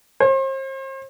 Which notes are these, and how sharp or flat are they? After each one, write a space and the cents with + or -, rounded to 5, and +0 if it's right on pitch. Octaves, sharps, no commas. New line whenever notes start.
C5 +40